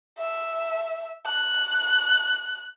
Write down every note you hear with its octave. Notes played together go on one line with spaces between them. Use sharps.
E5
F#6